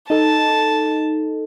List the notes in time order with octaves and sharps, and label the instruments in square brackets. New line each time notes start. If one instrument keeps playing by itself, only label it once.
[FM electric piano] D#4 A4 [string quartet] A5